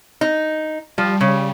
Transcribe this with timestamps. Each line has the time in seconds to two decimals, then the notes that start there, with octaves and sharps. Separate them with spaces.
0.21 D#4
0.98 F3 G3
1.21 C#3